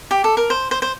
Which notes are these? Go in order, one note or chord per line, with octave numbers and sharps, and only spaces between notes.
G4
A4
A#4
C5
C5
C5